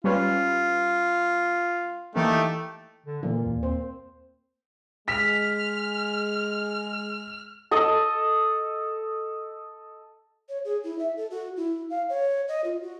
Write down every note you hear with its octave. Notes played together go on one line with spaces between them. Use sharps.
G3 C#4 F4 B4
E3 A3 A#3 D#4 G4
D3
A#2 E3 A#3
D#2
C4 C5
G#3 F6 B6
A4 D#5
C#5
G#4
E4
E5
A4
F#4
E4
F5
C#5
D#5
F4
F#4